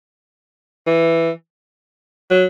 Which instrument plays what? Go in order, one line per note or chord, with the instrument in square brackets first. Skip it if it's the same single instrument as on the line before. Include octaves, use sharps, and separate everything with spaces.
[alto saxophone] E3
F#3